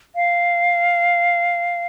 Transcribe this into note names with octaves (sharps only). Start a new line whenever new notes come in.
F5